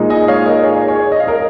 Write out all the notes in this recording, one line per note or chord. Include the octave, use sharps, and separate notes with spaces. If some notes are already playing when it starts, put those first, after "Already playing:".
Already playing: A#2 G#3 D#4
D#5 G#5
C#5 F5
A#4 D#5
G#4 C#5
G#4 C#5
D#5
F5
A#4 D#5